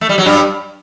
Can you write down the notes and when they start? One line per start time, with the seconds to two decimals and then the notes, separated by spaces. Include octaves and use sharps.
0.01 A3
0.09 G3
0.18 F#3
0.26 G2 G3